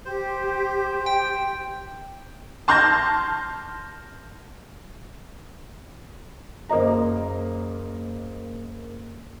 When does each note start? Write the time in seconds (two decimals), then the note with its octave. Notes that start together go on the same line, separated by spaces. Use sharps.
0.05 G4 C5
1.06 G5
2.68 A5 C6 F6 G6 G#6 A#6
6.69 F#1 A#3 C5 D#5 A#5